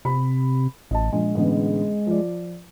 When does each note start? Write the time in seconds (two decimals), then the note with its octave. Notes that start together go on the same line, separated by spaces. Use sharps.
0.05 C3 B5
0.91 A1 D#5 A5
1.13 A#1 G#3
1.35 A1 D3 B3
2.07 F3 D5